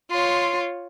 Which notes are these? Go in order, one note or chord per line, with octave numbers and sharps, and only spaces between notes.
F4 C#5 C6